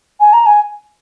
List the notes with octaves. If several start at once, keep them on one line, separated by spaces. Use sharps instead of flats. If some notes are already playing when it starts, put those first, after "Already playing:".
G#5
A#5
G#5